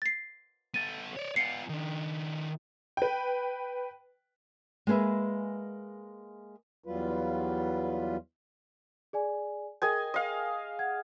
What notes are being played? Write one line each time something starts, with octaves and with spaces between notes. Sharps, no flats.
A6 C7
B3 A4 A6 D#7
C#5 D5
B3 F4 C7 C#7
D#3 D4
B4 G5
G#3 A#3 G#4 B4 E5
E2 F#3 G3 F4 B4
G#4 D5 G#5
G#4 A#4 D#5 G5 G#5
D#5 F5
F#5 G#6